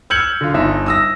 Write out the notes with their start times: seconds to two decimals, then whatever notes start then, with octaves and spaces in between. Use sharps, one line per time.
0.10 E6 F6 G6 G#6 C#7 F#7
0.41 D3 F4
0.54 G1 D#4 E5
0.86 D#6 E6 A#6